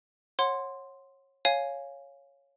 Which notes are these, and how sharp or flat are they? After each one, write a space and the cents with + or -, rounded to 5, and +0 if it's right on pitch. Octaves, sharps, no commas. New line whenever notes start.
C#5 -25 F#5 -5 C6 +0
C#5 +0 F5 +0 G#5 +0